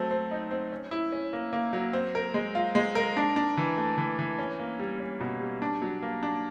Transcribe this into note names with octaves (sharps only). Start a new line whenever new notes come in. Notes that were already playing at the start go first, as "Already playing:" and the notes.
Already playing: F#3 A3 C4
C4
D#4
C4
C#4
E4
C#4
A#3
A#3
F#3
C4
A#4
G#3
F4
G#3
A#4
D4
D4
E3
A3
E3
E3
C#4
A#3
G3
C#4
B2
G3
D4
F#3
A#3
D4